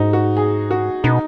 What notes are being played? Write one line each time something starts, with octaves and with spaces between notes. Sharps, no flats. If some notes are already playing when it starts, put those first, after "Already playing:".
Already playing: G#2 D#4 F#4
F#4
G#4
F#4
B2 D#4